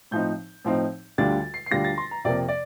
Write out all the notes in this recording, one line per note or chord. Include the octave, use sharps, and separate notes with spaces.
A2 F3 C4 D#4 G6
A2 F3 C4 D#4
D2 D3 G3 D4 F4 A6
C7
C7
D2 D3 G3 D4 F4 A#6
A6
C6
A#5
F2 C3 F3 A#3 D5
D5